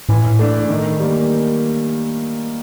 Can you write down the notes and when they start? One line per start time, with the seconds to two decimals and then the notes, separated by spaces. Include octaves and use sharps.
0.09 A2 E3
0.39 A3 D4
0.70 D#3
1.00 G3 A#3